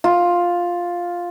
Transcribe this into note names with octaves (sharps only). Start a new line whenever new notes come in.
F4